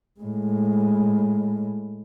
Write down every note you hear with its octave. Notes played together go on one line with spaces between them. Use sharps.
A2 G#3